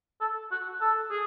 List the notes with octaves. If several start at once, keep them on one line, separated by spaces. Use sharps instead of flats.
A4
F#4
A4
G#4